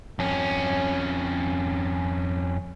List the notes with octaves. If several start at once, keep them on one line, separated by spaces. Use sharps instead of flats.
F2 C#4